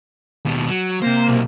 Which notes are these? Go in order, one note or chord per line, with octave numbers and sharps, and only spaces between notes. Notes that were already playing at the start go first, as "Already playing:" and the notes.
D#2 B2
F#3
C3 A#3 C5
B1